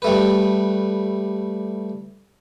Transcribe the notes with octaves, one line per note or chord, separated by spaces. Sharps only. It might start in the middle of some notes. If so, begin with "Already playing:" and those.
G3 A3 B4